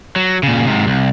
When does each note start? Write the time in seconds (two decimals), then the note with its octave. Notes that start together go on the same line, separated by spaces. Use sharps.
0.16 F#3
0.43 A#2 C#3
0.67 G#2 C3
0.87 C2